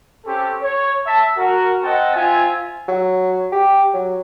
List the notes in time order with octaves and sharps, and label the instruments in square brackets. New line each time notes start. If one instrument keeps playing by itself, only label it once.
[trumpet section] C4 C#4 G4 A4
C#5
E5 A5
F#4 A#4
C4 D#5 F#5 G5 A5
C4 F4 E5 G#5
[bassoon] F#3
G4
F#3